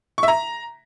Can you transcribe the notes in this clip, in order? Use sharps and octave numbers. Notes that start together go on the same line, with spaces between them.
C#6
E5
A#5